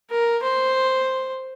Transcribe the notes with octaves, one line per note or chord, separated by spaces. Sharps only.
A#4
C5